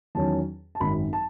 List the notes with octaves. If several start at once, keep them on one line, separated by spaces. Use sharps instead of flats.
E2 D#3 F#3 C#4 A5
A5
G#1 F#2 D#3 F#3 B5
A5